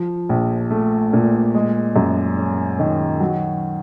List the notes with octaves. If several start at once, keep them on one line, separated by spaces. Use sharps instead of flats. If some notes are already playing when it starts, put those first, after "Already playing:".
Already playing: F3
A#1
A3
A#2
G#3
F#2
C#4
D#3
F#3